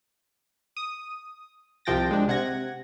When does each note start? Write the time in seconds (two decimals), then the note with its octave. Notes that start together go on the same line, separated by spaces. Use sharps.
0.77 D#6
1.85 C2 C3 F3 G5 A6 A#6
2.11 G#3 D4
2.28 C3 F#5 G#6 A#6